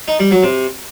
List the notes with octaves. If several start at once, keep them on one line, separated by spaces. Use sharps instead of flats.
D#4
G3
F#3
C3